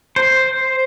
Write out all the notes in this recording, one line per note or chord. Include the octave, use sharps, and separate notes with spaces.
C5